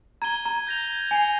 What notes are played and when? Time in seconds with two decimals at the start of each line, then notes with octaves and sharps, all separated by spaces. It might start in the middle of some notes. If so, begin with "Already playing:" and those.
0.22 A#5 G#6 D#7 G7
0.45 A#5
0.67 G6 A#6 F7
1.11 G#5 G#6 C7 D#7 G7